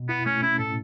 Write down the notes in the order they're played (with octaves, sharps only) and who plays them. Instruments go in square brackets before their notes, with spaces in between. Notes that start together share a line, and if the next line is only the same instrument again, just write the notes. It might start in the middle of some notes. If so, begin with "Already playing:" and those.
Already playing: [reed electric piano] B2
[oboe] B3 [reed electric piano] E4
[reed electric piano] A3 [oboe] C#4
[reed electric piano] C#4 [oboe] E4
[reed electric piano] A2 [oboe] A4